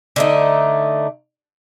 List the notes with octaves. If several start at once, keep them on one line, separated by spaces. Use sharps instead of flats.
D3 A3 D#4